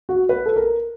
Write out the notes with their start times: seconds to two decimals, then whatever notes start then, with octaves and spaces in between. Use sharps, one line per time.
0.09 F#4
0.29 B4
0.46 A4
0.56 A#4